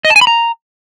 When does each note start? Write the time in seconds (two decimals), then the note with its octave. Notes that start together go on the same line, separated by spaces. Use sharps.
0.05 D#5
0.10 A5
0.16 G#5
0.21 B5
0.27 A#5